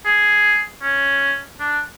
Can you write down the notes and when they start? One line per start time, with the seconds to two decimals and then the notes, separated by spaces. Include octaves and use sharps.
0.05 G#4
0.82 C#4
1.60 D4